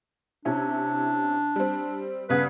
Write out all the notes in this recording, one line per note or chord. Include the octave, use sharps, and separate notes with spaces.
C3 C#4 D4 E4
G3 C4
G2 C#3 B3 B4